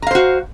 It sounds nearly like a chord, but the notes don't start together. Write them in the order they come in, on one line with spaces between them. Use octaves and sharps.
A#5 F5 C5 F#4